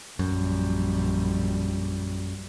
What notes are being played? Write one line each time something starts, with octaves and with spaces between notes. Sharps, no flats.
A#1 F#2 G3